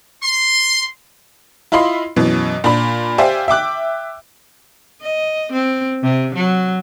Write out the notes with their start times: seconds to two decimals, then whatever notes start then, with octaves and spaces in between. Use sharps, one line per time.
0.23 C6
1.72 E4 F4 D#5 B5 C6
2.16 F#2 B2 E3
2.64 A#2 D4 B5
3.18 G4 C5 D5 E5 F5 G#5
3.48 E5 G5 D6 F#6
5.02 D#5
5.52 C4
6.02 C3
6.35 F#3